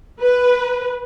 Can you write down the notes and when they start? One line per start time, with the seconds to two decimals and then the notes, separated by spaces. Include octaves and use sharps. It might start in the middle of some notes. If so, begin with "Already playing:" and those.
0.20 B4